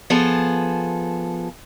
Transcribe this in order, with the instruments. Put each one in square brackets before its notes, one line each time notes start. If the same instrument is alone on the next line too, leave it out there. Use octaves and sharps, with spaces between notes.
[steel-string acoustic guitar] F3 B3 G#4 A4